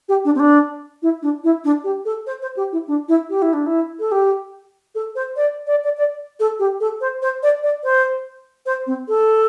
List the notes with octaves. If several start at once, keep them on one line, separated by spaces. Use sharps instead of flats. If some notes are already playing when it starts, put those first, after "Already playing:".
G4
D4
C4
D4
E4
D4
E4
D4
G4
A4
C5
C5
G4
E4
D4
E4
G4
E4
D4
E4
A4
G4
A4
C5
D5
D5
D5
D5
A4
G4
A4
C5
C5
D5
D5
C5
C5
C4
A4